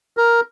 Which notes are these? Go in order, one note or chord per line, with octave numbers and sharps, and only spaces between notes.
A#4